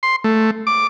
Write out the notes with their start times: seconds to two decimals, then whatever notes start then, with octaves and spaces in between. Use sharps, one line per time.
0.03 C6
0.24 A3
0.67 D6